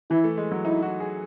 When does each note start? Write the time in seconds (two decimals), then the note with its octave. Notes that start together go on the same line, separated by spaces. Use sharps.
0.10 E3 E4
0.24 A3
0.38 G#3
0.52 F#3
0.65 D#4 E4
0.82 F#4
1.00 G#4